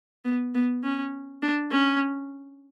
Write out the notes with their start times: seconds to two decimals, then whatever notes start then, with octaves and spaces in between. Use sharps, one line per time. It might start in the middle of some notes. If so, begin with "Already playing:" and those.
0.25 B3
0.55 B3
0.83 C#4
1.42 D4
1.71 C#4